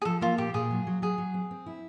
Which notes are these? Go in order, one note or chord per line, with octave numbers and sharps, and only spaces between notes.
G#4
F3 A4
A#3 F4
A#2 G4
A#2 G#4
F#3
F#3
F#3 G#4
F#3
C4
C4
E4